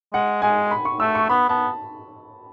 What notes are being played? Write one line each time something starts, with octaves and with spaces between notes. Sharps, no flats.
G#3 F#5
G#3 G#5
B5
C#6
A3 E6
C#6
B3 B5
B3 A5